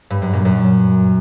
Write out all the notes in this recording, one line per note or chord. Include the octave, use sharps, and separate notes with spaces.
G2
F#2
A#2
F#2